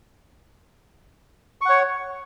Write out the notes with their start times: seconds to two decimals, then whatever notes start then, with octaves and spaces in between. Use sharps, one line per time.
1.61 C#6
1.65 F#5
1.69 C#5